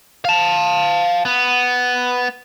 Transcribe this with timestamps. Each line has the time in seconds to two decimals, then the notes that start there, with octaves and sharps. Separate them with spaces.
0.25 F5 A5
1.25 B3